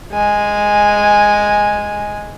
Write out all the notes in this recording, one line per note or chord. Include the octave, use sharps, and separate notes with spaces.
G#3 G#5